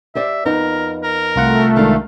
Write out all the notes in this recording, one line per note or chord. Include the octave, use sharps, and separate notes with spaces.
G4 C5 D5 E5
F2 B3 D#4 A#4
A#4
C2 A3 F4 F#5
D#3 G#3 D4 F5